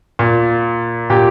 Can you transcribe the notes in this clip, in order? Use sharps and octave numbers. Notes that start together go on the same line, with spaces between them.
A#2
A#2 G4